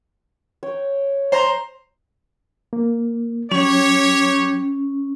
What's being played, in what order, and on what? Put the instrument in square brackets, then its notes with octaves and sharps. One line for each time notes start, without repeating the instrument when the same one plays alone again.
[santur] C#5 G5
[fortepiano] C5 A#5
[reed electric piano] A#3
[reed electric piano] F#3 [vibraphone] C#4 [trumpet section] G4 C#5